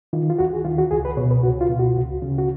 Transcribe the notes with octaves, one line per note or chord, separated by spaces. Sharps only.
D#3 F4
F4
D#2 F#4
G#4
D#3 F4
F#4
C#2 G#4
B4
B2 C#5
B4
C#2 F#4
F4
B2
F#4
C#2
C#3
F#4